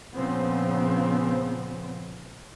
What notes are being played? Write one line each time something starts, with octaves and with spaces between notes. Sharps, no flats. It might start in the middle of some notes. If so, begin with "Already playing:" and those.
A#2 C#3 F3 B3 C4